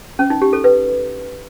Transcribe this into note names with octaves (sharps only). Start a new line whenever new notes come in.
C#4
D#4
G4
A4
B4